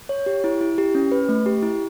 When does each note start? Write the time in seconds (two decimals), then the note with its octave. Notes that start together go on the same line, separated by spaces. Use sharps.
0.09 C#5
0.26 G4
0.44 E4
0.61 E4
0.78 G4
0.95 C#4
1.12 B4
1.29 A3
1.46 G4
1.63 E4